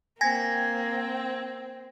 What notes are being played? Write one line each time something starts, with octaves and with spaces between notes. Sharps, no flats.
A#3 C4 G5 G#5 G#6 A#6